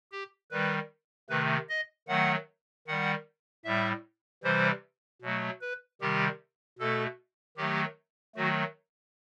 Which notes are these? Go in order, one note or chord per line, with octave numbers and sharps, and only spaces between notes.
G4
D#3 G3 B4
C3 D#3 A3 B4
D#5
D#3 F#3 A3 F#5
D#3 G3 F#5
A2 G3 E5
C3 E3 G3 C5
B2 F#3 A3
B4
C3 D#3 G3 G4
B2 A3 A4
D#3 F#3 A3 G4
D#3 F#3 A3 F#4